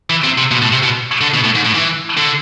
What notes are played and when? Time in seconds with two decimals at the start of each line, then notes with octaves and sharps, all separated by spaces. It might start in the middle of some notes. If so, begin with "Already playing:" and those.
0.10 E3
0.24 C3
0.38 C3
0.51 B2
0.62 A2
0.72 C3
0.83 B2
1.21 D3
1.34 B2
1.44 A2
1.55 G#2
1.66 A2
1.75 E3
2.17 D3